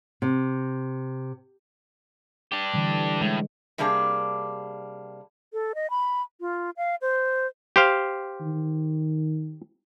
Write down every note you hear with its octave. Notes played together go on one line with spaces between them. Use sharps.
C3
D4 G4
D3 E3 G3
A2 G#3
C3 G3 A#3 D4 G#4
A4
D#5
B5
F4
F5
C5
G4 C5 F5
D#3